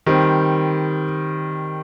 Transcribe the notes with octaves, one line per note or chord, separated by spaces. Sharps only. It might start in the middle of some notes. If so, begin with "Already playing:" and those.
D#3 G3 C4